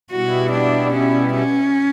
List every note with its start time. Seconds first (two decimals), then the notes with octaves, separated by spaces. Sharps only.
0.11 B2 G3 B3 E4 F#4
0.53 D4
0.94 C#4
1.35 C#4